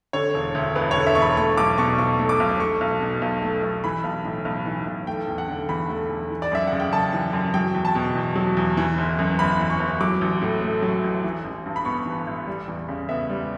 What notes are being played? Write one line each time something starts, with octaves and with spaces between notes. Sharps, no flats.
D3 C#5
E1
D2
E1 B4
C#5
D3
E5
E1 C#6
B5
A3 C#6
B1 D6
B2 C#6
B1 C#6
A3
D6
B1
A3 C#6
B1
B2
B1
A3
B1
E3 B5
B1
A2
B1
E3
B1
A3 G5
E2
F#5
D3
E2 B5
A3
E2
E3
D5
F#2 E5
C#3 F#5
G5
F#2 A5
E3
F#2
F#3 G5
E2
A5
B2
E2
F#3
E2
E3
G1
F#2
G1 B5
E3
C#6
G1
F#3 D6
A1
A2
A3
F#3
A1
E3
A1
G2
B5
B3 C#6
E3
A1
G3
E2
C#3
B3 E5
G3